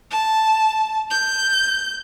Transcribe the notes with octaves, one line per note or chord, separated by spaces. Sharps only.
A5
G6